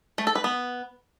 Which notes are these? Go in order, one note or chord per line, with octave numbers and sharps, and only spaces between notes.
A3
A4
B4
B3